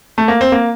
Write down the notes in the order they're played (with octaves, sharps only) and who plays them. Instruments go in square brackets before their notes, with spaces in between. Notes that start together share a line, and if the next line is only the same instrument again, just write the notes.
[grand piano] A3
A#3
C4
A#3